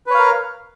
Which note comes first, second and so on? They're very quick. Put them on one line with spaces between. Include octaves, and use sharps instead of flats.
B4 C#5 F5 A#4